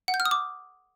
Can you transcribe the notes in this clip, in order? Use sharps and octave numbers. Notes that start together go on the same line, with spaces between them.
F#5
G6
F6
D#6
D6